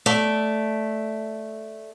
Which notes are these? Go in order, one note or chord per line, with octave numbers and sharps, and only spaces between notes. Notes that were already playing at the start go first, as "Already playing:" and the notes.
A3 D5